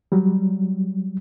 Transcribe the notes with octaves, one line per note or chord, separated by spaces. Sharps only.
F#3 G3